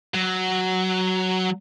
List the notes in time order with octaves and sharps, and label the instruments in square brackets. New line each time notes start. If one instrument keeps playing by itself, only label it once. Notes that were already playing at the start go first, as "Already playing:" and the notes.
[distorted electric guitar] F#3